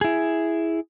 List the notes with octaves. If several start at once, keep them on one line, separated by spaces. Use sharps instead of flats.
E4 G#4